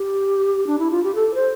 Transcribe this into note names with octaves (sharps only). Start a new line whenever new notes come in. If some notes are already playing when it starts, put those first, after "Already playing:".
Already playing: G4
D4
E4
F4
G4
A4
C5